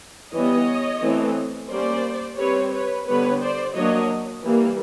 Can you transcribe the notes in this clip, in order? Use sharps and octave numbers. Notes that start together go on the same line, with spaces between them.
E3 G3 B3 C#5 D#5
E3 A3 C4
G3 A#3 C#4 C5 D5
G3 C4 B4 C#5
B4 C#5
D3 G3 B3 B4 C#5
C5 D5
F#3 A#3 D4 C#5 D#5
E3 G3 A#3